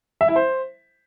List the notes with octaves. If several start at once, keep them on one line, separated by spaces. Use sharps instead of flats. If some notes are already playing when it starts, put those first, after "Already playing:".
E5
E4
C5